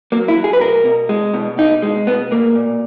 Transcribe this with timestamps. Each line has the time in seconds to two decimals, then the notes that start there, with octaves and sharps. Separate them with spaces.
0.12 F#3 A#3
0.28 E4
0.37 F#3
0.44 G#4
0.53 B4
0.60 B2 A#4
0.85 B2
1.09 G#3
1.34 B2
1.58 B2 D#4
1.82 G#3
2.07 B2 B3
2.31 B2 A#3
2.55 A#2